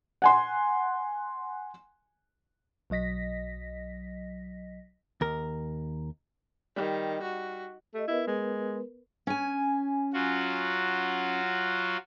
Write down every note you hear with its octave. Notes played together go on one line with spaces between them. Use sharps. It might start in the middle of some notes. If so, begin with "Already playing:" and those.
F#5 G#5 C6
B1 F#3 D#5 A#6 B6
D#2 A#4
D#3 G3
F#4
A3 G4 D#5
B3 E4 A#4 B4
G#3
C#4 G#5
F#3 F4 F#4